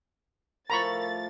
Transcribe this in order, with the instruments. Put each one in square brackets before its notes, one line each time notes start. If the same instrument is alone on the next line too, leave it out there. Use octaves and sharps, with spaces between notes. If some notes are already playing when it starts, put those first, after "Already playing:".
[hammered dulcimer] A2 F3 D6 [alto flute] A#4 [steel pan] A#5 B5 C#6 [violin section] A6